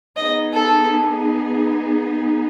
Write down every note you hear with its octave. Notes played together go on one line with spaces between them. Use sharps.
B3 D#4 G#4 D#5
A4